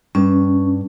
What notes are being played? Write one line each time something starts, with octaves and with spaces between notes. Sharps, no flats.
G2 C#4